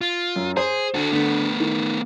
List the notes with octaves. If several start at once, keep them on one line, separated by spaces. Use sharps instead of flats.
F4
F#2
G#4 C5
D3 F#4 A4
D3 A3 B3
D#3